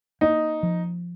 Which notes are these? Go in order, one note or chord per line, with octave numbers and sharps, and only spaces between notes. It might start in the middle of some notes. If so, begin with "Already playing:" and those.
A#3 D#4
F3